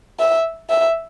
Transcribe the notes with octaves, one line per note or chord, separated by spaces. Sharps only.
E5
E5